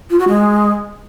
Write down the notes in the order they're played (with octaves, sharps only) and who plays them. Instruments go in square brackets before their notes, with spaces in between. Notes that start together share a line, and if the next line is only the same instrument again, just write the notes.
[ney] F4
F#4
G#3